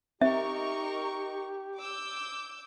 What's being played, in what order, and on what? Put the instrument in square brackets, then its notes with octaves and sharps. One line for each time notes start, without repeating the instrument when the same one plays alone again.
[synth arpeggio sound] C4 [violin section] D#4 A#4 C#6 [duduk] G4 [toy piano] E5
[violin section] D6 E6 G6